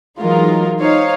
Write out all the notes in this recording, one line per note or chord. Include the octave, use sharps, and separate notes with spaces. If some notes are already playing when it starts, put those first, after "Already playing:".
E3 F#3 G#3 D#4 F4 A#4
D#4 C5 C#5 F5